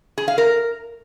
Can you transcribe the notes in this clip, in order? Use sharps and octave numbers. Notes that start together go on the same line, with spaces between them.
G#4
F5
A#4